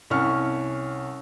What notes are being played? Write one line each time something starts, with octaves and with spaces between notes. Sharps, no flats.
C2 C#4 C#6 F6